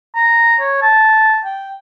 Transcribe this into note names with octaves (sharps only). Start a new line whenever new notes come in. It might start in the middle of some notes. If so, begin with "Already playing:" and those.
A#5
C#5
A5
G5